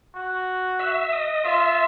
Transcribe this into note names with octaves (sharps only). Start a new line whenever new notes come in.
F#4
E5
D#5
F4 E5